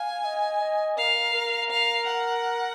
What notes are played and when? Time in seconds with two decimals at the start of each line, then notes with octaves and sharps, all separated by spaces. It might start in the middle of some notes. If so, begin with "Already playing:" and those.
Already playing: F5 G#5
0.25 D#5
0.61 D#5
0.97 A#4 F5
1.34 A#4
1.70 F5
2.07 F#5